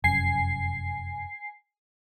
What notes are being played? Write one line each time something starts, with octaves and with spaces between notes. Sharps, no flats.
F1 F#2 G#5 C7